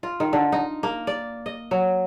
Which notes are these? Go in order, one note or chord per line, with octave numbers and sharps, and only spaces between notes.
F4
D#3
D3
D#4
A#3
D5
D#5
F#3